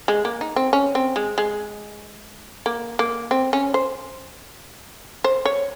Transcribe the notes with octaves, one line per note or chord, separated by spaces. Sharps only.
G#3
A#3
D#4
C4
C#4
C4
G#3
G#3
A#3
A#3
C4
C#4
C5
C5
C#5